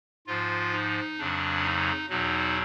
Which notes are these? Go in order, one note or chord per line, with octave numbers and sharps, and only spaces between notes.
G#2 F3 F4
D#4
F2 C#3 F#3 D4
D#4
E2 B2 F#3 D#4